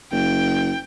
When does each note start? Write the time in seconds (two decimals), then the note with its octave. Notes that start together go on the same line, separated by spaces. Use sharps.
0.12 F#1 G5